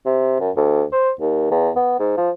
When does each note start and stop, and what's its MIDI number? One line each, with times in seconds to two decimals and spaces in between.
0.06 0.37 48
0.40 0.50 42
0.56 0.84 38
0.92 1.10 72
1.21 1.47 39
1.51 1.70 40
1.76 1.96 59
2.00 2.16 44
2.17 2.30 53